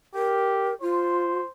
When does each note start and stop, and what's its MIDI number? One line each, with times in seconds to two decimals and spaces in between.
0.15 0.72 67
0.15 0.74 70
0.81 1.40 65
0.81 1.49 72